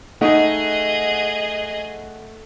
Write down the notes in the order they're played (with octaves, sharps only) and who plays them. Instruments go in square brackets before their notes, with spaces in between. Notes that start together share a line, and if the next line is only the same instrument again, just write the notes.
[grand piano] A3 F#5 [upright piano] D#4 [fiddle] G#4 D#5